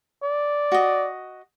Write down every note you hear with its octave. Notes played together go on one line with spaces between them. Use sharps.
D5
F#4 D#5